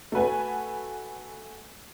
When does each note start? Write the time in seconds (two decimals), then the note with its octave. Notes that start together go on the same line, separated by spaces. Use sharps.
0.12 A3 F#4 B4 G#5